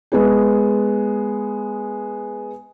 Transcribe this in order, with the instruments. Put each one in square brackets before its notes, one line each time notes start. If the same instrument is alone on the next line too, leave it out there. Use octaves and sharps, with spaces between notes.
[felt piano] G#3 B3 G#4